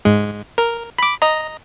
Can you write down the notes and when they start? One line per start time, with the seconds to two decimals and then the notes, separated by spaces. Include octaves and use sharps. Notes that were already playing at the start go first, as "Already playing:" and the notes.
0.05 G#2 G#3
0.58 A#4
0.99 B5 D6
1.22 D#5 A#5